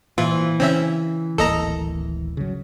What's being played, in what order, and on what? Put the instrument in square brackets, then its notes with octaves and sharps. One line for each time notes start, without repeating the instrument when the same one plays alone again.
[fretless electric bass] A#2 [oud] E3 [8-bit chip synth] F4
[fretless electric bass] C#3 [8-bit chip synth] C4 C#4 E5
[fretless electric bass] D1 G#1 A#3 [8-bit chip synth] A4 D#5 A#5
[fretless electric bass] C#3 F#3